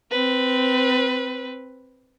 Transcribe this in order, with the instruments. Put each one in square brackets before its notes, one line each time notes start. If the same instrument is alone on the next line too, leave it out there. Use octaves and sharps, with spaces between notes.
[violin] C4 B4